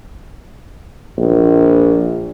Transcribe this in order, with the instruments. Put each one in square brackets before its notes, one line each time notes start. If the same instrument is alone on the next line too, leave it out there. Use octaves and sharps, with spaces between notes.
[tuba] A#1